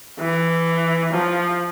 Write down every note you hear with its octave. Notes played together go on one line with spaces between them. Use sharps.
E3
F3